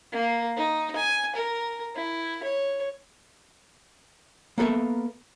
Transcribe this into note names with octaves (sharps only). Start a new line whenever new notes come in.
A#3
D#4
G#5
A#4
E4
C#5
A#3 B3 A4 A#4 E5